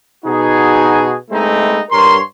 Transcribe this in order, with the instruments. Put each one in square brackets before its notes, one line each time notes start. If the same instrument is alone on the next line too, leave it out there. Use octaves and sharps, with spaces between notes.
[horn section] B2 D#4 F#4 G#4
G#3 A3 B3 C4 D#4 E4
G2 A#4 C#5 C6